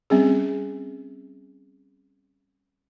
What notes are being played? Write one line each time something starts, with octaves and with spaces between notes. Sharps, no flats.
G3 C4 C#4 G#4